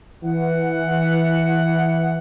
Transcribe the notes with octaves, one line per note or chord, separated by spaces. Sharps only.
E3 F#5